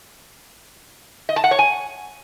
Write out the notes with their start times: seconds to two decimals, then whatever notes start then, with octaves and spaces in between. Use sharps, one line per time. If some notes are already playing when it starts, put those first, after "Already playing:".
1.29 D#5
1.36 A5
1.44 F#5
1.51 C#5
1.59 G#5